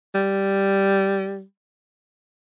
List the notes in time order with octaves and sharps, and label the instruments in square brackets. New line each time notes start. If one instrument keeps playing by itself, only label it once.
[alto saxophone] G3